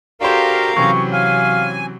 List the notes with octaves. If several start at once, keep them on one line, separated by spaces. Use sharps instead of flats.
D4 F#4 G4 A4 A#4 C5 F5 A#5
C3 E3 F#3 C4 C#4 C#6
F5 G#5